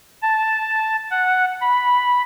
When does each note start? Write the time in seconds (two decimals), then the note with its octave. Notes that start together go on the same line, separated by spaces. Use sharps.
0.22 A5
1.11 F#5
1.61 B5